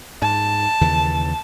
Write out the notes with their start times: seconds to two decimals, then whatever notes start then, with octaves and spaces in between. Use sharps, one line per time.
0.22 G#2 A5
0.81 D#2 C#3 E3